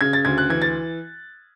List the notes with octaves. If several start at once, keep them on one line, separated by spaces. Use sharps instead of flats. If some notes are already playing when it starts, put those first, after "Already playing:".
C#3 G#6
A6
D2 G#6
F#6
E3 G#6
A6